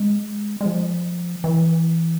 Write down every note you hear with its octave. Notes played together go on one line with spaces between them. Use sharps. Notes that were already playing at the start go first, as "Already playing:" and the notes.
Already playing: G#3
G#3
F3
E3